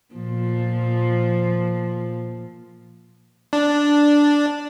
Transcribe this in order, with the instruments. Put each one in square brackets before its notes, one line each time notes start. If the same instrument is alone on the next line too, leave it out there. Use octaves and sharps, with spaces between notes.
[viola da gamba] A#2 F3
[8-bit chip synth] D4